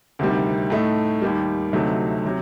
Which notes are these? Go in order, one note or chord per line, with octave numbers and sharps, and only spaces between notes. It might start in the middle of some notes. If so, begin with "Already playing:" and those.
D2 C3 D#3 G3
A2 A3 D#4
D#2 D#3 G3
D2 C3 F#3 A3 D#4
C3 F#3